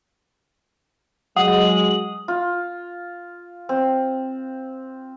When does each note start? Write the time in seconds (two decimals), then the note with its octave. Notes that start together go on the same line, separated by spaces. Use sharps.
1.37 F#3 G#3 F#5 D#6 F#7
2.28 F4
3.69 C4